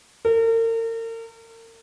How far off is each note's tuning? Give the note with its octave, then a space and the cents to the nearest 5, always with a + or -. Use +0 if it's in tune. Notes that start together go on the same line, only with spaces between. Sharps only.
A#4 -40